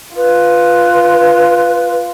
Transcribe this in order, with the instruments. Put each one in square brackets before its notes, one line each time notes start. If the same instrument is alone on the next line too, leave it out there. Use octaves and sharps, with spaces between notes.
[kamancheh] F4 [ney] B4